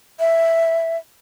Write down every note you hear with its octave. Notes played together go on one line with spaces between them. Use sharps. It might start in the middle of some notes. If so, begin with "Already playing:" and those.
E5